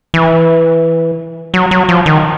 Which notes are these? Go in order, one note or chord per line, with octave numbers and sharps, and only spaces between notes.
E3
F#3
F#3
F3
D#3